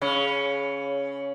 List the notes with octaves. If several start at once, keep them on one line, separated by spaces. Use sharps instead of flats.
C#3 C#4